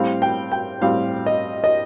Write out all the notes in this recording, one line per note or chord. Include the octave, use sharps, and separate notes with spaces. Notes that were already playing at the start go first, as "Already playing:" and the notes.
Already playing: A2 G3 C4 F5
G5
G5
A2 G3 C4 F5
D#5
D#5